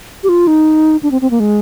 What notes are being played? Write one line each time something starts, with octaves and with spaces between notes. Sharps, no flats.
G4
F4
D#4
D4
C4
C4
A#3
G#3